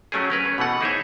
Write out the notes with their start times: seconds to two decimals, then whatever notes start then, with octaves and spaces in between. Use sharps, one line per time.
0.12 F#3 A3 C#4 G4 G#4
0.30 C#4 A#4 B4
0.45 C#4
0.58 B2 E3 A3 F#5
0.81 D#4 E4 G#4 C5 C#5 E5